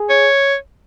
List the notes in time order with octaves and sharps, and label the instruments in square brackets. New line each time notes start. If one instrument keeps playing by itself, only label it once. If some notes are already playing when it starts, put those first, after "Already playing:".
Already playing: [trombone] G#4
[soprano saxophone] C#5